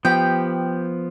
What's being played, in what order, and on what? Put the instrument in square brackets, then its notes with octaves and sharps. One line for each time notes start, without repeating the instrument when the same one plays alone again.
[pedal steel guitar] F3 B3 [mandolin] G4 G5